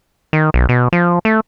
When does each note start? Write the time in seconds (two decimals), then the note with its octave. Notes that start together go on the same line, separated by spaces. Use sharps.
0.33 D#3
0.54 B1
0.69 B2
0.93 F3
1.25 A3